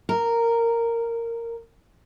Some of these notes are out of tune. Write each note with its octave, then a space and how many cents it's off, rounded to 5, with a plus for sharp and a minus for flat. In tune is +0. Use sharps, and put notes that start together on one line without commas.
A#4 -10